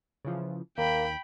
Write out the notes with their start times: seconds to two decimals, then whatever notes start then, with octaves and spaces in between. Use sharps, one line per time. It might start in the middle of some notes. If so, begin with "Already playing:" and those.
0.25 C#3 E3 F3
0.78 D#2 A#3 G5 B5